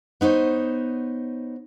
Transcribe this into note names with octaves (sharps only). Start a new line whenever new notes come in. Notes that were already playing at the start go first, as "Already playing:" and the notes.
B3 D#4 C5 C#5